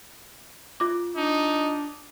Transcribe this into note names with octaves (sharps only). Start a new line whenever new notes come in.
F4 D6
D4 D#4